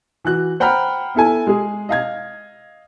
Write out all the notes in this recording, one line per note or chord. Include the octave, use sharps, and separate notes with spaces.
E3 F#4 F#6
C5 F#5 G5 A#5 B5 F6
B3 E4 A4 G#5
G#3 G#4
D#5 F5 G#6